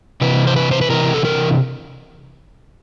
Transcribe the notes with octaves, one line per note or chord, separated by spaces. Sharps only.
C3 E3 B4
C5
B4
C5
B4
C3 E3 A#4
A4
A#4